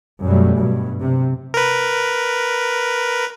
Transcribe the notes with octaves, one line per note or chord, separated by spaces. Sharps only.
F#2 B2 F#3 G3 A3
G2 B2
C3
A#4 B4